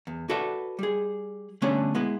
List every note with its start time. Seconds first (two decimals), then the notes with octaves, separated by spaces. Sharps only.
0.07 E2
0.29 F#4 A4 B4 D5 E5 F#5
0.79 G3 G#4
1.62 D3 G3 A3 B3 C#4 D4
1.95 G#3 B3 E4